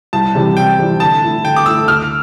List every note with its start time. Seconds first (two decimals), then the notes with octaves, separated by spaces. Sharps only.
0.13 C2 A5
0.35 C3 E3 G3 C4
0.56 C2 G5
0.79 C3 E3 G3 C4
1.00 D3 A5
1.22 A3 E4 A4
1.44 D3 G5
1.56 D6
1.66 A3 E4 A4 E6
1.88 D2 F6